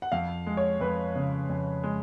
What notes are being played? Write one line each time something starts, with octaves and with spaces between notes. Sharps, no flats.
F#5
F2 F5
G#3
C#5
F2 B4
C#3
F2
G#3